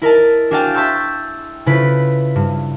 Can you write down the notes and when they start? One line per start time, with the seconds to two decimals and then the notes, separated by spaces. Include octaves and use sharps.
0.02 E4 A#4 D#5 A5
0.51 D4 F#4 G#4 F5 G5 A5
0.74 E5 A5 C6 C#6 E6 G6
1.66 C#3 E4 F4 A4 B4
2.36 G2